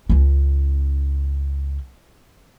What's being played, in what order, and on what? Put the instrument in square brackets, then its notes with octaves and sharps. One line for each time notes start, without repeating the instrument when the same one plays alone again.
[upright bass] C#2 C#4